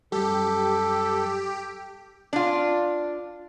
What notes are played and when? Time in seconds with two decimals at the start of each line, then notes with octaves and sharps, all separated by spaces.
0.12 F#2 G3 G4 A4
2.33 D4 F4